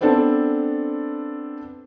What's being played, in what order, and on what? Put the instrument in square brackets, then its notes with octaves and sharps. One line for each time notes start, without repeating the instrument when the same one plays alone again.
[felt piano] B3 C4 D4 A4